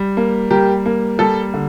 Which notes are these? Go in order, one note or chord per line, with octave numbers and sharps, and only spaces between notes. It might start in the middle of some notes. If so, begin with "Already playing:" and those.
Already playing: G3
A#3
G3 G4 A#4
A#3
G3 A4
D3